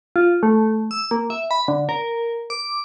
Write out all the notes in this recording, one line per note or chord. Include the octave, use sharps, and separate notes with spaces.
F4
A3
E6
A#3
E5
B5
D3
A#4
D6